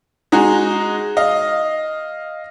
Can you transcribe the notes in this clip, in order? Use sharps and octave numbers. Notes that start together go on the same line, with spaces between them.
G#3 D#4 F#4 G#4
D#5 F5